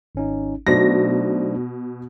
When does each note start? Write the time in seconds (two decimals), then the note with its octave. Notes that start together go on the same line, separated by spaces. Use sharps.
0.15 G#1 C#4 D#4
0.67 B2 F#3 A3 D4 D#4 C5 D5 A#6